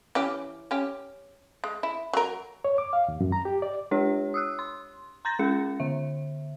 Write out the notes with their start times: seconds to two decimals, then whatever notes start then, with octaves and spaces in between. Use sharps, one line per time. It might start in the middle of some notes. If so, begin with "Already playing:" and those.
0.15 E3 C#4 G4
0.71 C#4 G4
1.64 G#3
1.83 E4
2.13 F#3 A#4
2.65 C#5
2.78 D6
2.93 F5
3.08 D#2
3.21 F#2
3.32 A#5
3.45 G4
3.62 D5
3.91 G#3 D4 G4 C#5
4.34 D#6 E6 F#6
4.59 C6
5.25 A#5 C6 G6 A6 A#6
5.39 G#3 C#4 G#4 C#7
5.80 D3 E5